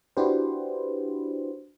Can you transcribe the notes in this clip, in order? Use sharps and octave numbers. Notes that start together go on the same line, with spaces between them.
D4 E4 F#4 G4 B4 C5